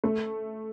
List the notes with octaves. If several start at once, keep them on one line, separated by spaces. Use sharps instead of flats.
A3